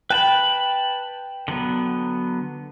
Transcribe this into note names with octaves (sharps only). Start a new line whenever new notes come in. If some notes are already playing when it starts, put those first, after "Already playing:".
B4 G5 A5 B5
D3 F#3 B3